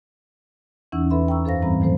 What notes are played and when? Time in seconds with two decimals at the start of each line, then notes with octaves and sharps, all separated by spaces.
0.92 E2 E3 C#4 D#4 F#5 E6
1.10 A4 B4 E5 B5 C6
1.28 G5 A#5 C#6 E6
1.44 F#2 A4 C5 F5 A#6
1.62 G#2 E3 G3 C4 A#5 B5
1.80 D#3 E3 F#3 A3 A4 C5